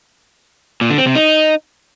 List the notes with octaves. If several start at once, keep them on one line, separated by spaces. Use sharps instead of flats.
A#2
D3
C4
C3
D#4